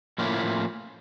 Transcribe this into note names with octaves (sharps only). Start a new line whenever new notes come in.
A2 F3 A#3 C#4 E4